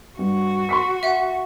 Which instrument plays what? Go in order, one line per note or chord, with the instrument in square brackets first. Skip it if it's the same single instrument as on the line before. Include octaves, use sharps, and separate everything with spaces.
[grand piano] G2 [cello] F#4
[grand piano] C6 C#6 B6
[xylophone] E5 F#5